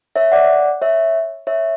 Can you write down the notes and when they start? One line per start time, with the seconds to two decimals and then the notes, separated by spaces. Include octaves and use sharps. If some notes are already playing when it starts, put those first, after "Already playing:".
0.16 C#5 E5
0.32 D5 F#5
0.82 C#5 E5
1.47 C#5 E5